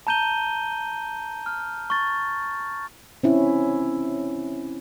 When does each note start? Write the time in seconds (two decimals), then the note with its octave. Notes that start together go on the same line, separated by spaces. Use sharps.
0.07 A5 A#5 G6 D#7 G7
1.46 F6
1.90 C#6 A6
3.23 C4 C#4 E4